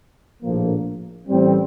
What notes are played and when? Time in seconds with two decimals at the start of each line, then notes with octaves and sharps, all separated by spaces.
0.43 A#1 A2 F3 A#3
1.28 A1 A2 G3 C4